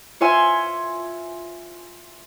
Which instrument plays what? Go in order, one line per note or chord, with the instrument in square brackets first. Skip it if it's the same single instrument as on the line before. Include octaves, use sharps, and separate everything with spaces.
[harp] F4 C#5 E5 G#5 C6